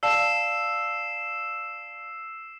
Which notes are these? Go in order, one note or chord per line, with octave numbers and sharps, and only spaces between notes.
D5 F5 A5 E6 C7 E7